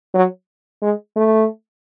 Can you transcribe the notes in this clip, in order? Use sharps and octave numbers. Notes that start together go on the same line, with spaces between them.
F#3
G#3
A3